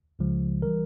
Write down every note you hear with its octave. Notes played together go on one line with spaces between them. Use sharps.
C#2 C#3 F3 G#3
E3 G3 A#4